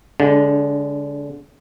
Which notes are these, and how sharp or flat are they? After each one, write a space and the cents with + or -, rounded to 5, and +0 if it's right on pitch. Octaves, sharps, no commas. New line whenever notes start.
D3 -30 G#3 -5 D4 +0